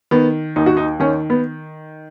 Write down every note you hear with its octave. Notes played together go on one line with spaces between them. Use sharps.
D#3 B3
D#2 D#4
F#4
D#4
D#3 C#4
B3